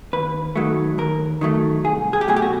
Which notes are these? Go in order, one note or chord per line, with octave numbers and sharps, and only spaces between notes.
D#2 B4
D#3 F#3 A3
D#2 A#4
D#3 F#3 A3
C2 G#4
G#4
G4
B2 F#3 A3 G#4
G4
F#4